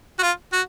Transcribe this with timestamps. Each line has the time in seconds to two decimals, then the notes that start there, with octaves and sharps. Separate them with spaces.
0.19 F#4
0.22 F4
0.52 F#4